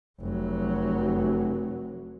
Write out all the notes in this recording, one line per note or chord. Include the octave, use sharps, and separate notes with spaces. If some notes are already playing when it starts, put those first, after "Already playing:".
F1 F#3